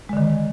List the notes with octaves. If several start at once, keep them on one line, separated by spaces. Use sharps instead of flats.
D3 D#3 G#3